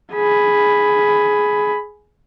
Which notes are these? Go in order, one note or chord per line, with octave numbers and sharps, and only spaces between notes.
G#4 B5